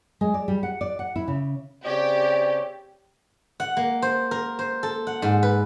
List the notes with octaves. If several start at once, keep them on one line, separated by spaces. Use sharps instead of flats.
G#3
D5
G3
F#5
D5
F#5
E4
C#3
C#3 C4 G4 C#5 D5
F#5
A#3
C5
A#4
C5
A4
F#5
G#2
B4